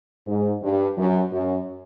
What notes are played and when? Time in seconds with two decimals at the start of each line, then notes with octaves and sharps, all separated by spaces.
0.27 G#2
0.63 G2
0.98 F#2
1.32 F#2